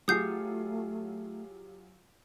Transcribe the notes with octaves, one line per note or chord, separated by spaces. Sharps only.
F#3 A3 F4 G4 G#4 D#6 G6 C7